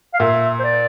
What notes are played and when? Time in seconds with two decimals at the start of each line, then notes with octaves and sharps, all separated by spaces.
0.14 F5
0.20 A#2 E5
0.59 C5
0.64 D5